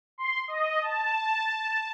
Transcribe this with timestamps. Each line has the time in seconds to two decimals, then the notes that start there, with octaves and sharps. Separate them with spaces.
0.18 C6
0.48 D#5
0.81 A5